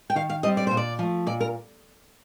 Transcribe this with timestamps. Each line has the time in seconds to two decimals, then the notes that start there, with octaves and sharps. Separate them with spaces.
0.10 G5
0.16 D#3 F5
0.29 F5
0.43 G3 C4 D#5
0.57 D5
0.67 A#2 C5
0.77 D5
0.99 F3 A3
1.27 A#2 D5
1.40 A#4